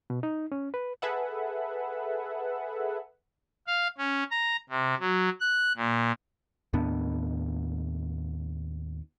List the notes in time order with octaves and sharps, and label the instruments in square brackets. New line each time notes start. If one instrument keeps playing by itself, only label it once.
[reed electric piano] B2
D#4
C#4
B4
[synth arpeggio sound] G#4 A4 B4 E5 F#5
[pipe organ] F5
C#4
A#5
C3
F#3
F#6
A#2
[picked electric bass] D#2 A2 B3 D4